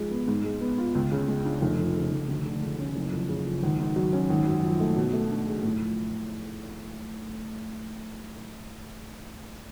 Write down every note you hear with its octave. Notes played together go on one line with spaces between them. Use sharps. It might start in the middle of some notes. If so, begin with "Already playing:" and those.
Already playing: G#2 F3 G#3
B3
G#2
G#3
B3
F4
C#2
C#3
G#3
D4
F1
F2
C#3
F1
D2
D3
G#3
C#4
F#1
F2
C#3
F3
G#1
G#2
F#3
C#4
G#1
F#2
F3
A3
B2
A3
D4
G#4
A2
F3